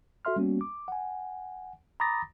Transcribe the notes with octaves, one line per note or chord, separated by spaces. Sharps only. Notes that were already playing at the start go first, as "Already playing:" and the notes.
F#4 A4 E5 C6 F6
G3 A#3 B3 C#4 F#4
D6
F#5 G#5
A#5 B5 D6 D#6 A6 A#6